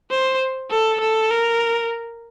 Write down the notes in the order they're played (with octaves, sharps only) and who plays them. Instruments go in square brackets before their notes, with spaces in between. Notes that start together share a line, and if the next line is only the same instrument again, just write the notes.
[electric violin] C5
A4
A4
A#4